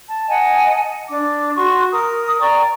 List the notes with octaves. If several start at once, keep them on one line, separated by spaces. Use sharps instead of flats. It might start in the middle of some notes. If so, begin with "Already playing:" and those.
A5
D#5 F#5 G#5 A5
D4 D6
F#4 C6 C#6
A#4 D#6
D5 G5 A#5 C#6